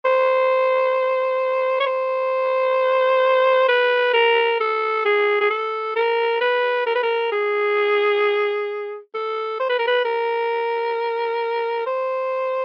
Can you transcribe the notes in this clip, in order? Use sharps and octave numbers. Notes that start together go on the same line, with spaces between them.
C5
C#5
C5
B4
A#4
A4
G#4
G#4
A4
A#4
B4
A#4
B4
A#4
G#4
A4
C5
B4
A#4
B4
A#4
C5